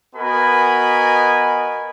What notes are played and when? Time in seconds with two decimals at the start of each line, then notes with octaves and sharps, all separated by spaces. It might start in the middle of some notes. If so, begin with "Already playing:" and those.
0.16 B3 F#4 A#4 D#5 G#5 B5